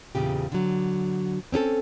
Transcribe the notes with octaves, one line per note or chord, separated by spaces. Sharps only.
E2 A#2 C#3 G4
D3 F#3
C4 C#4 G#4 A4